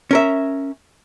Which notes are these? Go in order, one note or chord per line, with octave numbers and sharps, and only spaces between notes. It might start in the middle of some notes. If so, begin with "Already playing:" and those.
C#4 A#4 E5